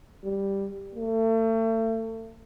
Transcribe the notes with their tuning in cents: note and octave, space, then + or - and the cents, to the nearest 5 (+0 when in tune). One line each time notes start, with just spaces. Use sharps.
G3 +5
A3 +35